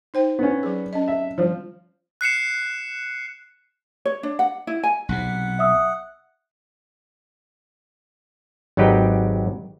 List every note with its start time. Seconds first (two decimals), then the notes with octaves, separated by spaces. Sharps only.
0.14 D#4 C5 G5
0.39 B3 C#4
0.63 F#3 G#4
0.93 C#4 D#5
1.08 E5
1.38 F3 G3
2.21 F#6 C7 C#7 E7
4.05 C#5
4.23 D4
4.39 F#5
4.67 E4
4.83 G#5
5.09 B1 C3 F#5
5.59 E5 D#6 E6
8.77 G#1 F#3 D#4 G4 B4 G5